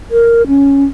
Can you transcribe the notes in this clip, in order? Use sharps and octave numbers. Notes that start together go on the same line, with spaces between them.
A#4
C#4